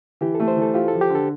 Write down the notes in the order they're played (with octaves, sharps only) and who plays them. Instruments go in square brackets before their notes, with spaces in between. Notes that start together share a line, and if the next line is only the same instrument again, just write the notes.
[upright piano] E3 [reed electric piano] G4
[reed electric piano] A4
[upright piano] A3
[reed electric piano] C5
[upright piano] E3
[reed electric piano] A4
[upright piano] F4 [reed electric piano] G4
[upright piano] F3 [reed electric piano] A4
[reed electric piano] G4
[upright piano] D3
[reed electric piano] A4